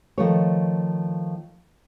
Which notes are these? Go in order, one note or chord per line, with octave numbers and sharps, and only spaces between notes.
D#3 F3 A3 C#5